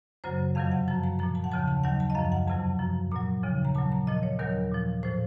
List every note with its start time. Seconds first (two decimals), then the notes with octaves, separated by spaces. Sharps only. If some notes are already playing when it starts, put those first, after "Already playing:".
0.24 F#2 C#3 F#3 C5
0.55 F2 C3 D#3 F#3 F5
0.72 F#5
0.88 F#2 F3 A5
1.03 A#5
1.19 A#2 F3 A#5
1.35 A5
1.44 F#5
1.51 D#2 C#3 F3 A5
1.68 A5
1.84 D#2 D#3 F#3 F#5
2.00 A5
2.10 D#5
2.15 F#2 F3 F5
2.32 F#5
2.47 F2 C3 F#3 A5
2.79 F#2 F3
3.11 A#2 F#3 A#5
3.43 D#2 C#3 F3
3.65 A#5
3.75 A#2 F#3 A5
3.92 A#5
4.07 A#2 F3 D#5
4.23 C#5
4.39 D#2 D#3 F#3 A#4
4.71 A#2 F3
5.03 A2 F3 C5